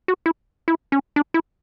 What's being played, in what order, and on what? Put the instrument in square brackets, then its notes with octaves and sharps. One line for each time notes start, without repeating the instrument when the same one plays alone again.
[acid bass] F#4
E4
E4
C#4
D4
E4